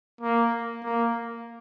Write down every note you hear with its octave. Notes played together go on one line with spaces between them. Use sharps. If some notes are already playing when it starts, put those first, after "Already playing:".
A#3
A#3